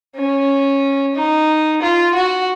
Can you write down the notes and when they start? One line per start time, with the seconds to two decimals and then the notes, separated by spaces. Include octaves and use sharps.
0.16 C#4
1.15 D#4
1.82 F4
2.15 F#4